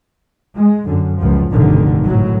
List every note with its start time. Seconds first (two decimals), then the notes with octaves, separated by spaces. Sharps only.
0.56 G#3
0.85 F#2 D3
1.18 C#2 F#2 F3
1.51 F1 B1 G2 D3 D#3
2.04 G#1 A2 F#3